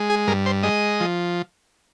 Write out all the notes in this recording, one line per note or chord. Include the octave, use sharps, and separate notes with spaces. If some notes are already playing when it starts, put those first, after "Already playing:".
Already playing: G#3
G#4
G2 A#4
C5
G#3 D#5
F3